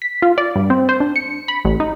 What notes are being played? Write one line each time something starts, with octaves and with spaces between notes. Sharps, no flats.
B6
F4
D5
G2
C4
C5
D4
C#7
B5
A1
D#4